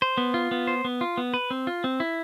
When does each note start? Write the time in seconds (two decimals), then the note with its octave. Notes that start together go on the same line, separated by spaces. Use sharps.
0.02 C5
0.17 B3
0.34 F4
0.51 B3
0.67 C5
0.85 B3
1.01 F4
1.18 B3
1.34 B4
1.51 C4
1.67 F4
1.84 C4
2.00 E4